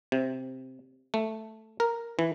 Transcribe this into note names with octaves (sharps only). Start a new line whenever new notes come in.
C3
A3
A#4
E3